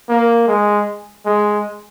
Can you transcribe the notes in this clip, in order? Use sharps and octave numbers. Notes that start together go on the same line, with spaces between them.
A#3
G#3
G#3